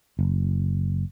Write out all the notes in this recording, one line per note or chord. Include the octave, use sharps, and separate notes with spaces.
F#1